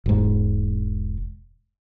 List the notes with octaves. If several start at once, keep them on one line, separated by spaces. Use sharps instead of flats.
E1 G#2